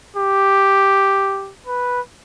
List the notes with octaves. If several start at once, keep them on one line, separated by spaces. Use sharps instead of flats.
G4
B4